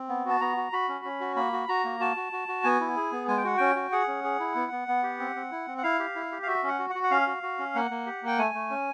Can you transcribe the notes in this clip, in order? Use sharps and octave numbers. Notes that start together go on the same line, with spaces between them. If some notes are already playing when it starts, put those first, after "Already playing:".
Already playing: C4
B3
F#4 A5
B3 A#5
F#4
F#4 B5
C#4
C#4
F#4
A#3 B5
F#4
F#4 A#5
A#3
F#4 A5
F#4
F#4
F#4
B3 G#5
E4
G#4
B3
G#3 G#5
G5
F#4 F#5
C#4 G5
F#4
G#4 F#5
C#4
G#4
E4
B3
B3
B3
G4
C4
C4
E4
C4
F#5
E4 F5
G4
E4
G4
F5
F#4 E5
C#4 F#5
F#4
F#5
F#4
F#5
C#4 F5
F#4
F#4
C#4
A#3 F#5
A#3
G4
A#3 G5
A3 G#5
A3
C#4